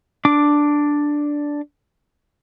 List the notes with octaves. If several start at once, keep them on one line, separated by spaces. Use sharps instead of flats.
D4 D6